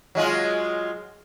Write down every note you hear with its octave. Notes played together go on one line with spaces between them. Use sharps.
F#3 G#3 F4